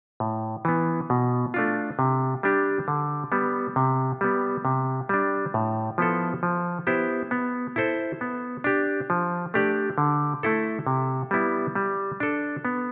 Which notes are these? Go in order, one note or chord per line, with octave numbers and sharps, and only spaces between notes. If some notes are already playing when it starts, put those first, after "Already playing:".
A2
E3 B3
B2
A3 D4 F4
C3
G3 D4 G4
D3
G3 B3
C3
G3 B3
C3
G3 D4
A2
F3 B3 E4 A4
F3
B3 E4 G4 C5
B3
E4 A4 C5
B3
D4 G4
F3
A3 D4 G4 D5
D3
A3 E4 A4
C3
G3 B3 E4
G3
D4 A4
B3